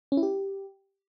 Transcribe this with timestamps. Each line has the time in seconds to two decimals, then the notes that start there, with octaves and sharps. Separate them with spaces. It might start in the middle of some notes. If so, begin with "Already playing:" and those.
0.12 C#4
0.17 E4
0.23 G4